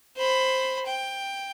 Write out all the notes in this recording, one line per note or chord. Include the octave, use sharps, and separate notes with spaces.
C5 B5
G5